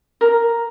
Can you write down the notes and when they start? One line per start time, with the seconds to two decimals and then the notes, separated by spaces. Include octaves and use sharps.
0.21 A#4